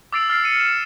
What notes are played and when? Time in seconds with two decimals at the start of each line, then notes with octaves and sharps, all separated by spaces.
0.12 D6 E6 A6 C7 D7 F7
0.28 E6 F6 A6 C7
0.44 C#7 D#7
0.60 E7